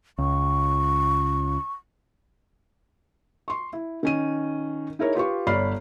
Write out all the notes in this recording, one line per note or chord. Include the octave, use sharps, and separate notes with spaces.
C#2 C#6
C6 C#6
E4
D#3 C#4 D#7
D#4 E4 G#4 A#4 C#5
F4 G4 B4 C#6
G1 C#5 D5 B5 F6 C7